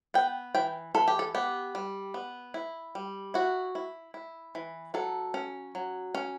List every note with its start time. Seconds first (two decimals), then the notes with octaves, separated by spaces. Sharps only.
0.14 B3 G5
0.55 E3 G5
0.95 E3 A4
1.08 G4
1.19 A4
1.35 B3 G4
1.75 G3
2.14 B3
2.54 E4
2.95 G3
3.34 E4 F#4
3.75 E4
4.14 E4
4.55 E3
4.94 F#3 A4
5.34 C#4
5.75 F#3
6.15 C#4